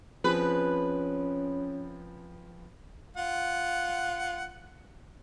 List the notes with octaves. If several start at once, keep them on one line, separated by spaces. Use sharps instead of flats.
F3 C4 C#4 G#4 B4
F4 F#5